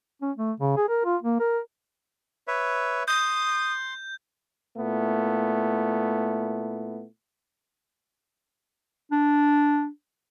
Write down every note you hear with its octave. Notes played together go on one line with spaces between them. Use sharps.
C#4
A3
C#3
G#4
A#4
F4
A#3
A#4
B4 C#5 E5
C6 D#6 G6
A#2 A3 B3 E4
D4